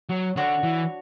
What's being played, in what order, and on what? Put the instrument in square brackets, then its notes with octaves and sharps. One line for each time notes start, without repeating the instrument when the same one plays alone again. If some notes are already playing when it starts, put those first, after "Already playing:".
[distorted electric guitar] F#3
[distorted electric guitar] D3 [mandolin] D4 F#4 C#5
[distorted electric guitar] E3